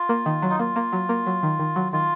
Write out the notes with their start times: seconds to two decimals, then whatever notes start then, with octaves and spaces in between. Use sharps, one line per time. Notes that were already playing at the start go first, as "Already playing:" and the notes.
Already playing: F4
0.09 A#3
0.26 D#3
0.42 F#3
0.50 D#4
0.59 A#3 F4
0.76 A#3
0.93 F#3
1.09 A#3
1.26 F#3
1.43 D#3
1.59 D#3
1.76 F#3
1.92 D#3 F4